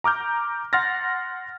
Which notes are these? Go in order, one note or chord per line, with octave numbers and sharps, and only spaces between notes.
A#5 D6 F6 G6
F#5 C6 F6 A6 A#6